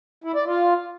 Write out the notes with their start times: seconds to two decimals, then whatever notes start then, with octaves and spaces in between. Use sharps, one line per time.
0.24 E4
0.35 D5
0.46 F4